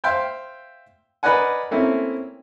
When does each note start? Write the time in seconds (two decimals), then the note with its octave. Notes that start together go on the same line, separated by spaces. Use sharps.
0.04 C5 E5 F5 G5 C6
1.23 A#4 B4 D5 D#5 F#5 G#5
1.71 A3 A#3 C4 C#4 E4